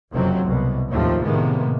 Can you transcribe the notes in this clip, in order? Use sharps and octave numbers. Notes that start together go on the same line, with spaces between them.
F#1 F2 C3 F#3 C4
C2 B2
D#2 A2 F3 A3 C4
A2 C3 D#3 G#3 A#3 B3